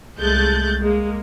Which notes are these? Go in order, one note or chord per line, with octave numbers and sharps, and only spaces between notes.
C2 G#3 A3 F#6 G6 A6
G#3 A#3